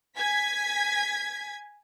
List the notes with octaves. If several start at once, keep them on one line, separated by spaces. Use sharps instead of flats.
G#5 G#6 B6